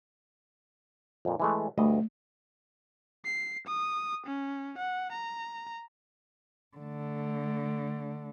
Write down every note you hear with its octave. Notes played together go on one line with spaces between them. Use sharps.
F2 A#2
E3 G#3 A3
D2 G2 A3 D#5
C7
D#6
C#4
F#5
A#5
D3 A3